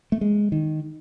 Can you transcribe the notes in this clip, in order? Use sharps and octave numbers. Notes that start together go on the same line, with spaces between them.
A3
G#3
D#3